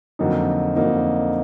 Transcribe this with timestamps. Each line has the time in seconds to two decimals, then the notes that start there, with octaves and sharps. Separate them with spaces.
0.19 F2 D3 F#3 A#3 D#4
0.76 F2 D3 F#3 A#3 D#4